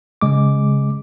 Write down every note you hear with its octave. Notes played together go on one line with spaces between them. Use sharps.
C#3 G#3 D6